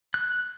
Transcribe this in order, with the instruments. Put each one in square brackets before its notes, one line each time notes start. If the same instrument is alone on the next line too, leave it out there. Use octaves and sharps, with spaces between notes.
[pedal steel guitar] F#6